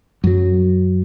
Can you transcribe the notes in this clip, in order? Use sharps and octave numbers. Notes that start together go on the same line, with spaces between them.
F#2 F#3